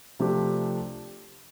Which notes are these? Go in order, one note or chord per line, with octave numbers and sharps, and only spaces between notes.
C3 F3 A3 D4 G4